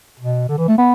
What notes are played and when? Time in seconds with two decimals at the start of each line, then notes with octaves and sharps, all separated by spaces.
0.20 B2
0.48 D3
0.58 E3
0.68 A3
0.78 B3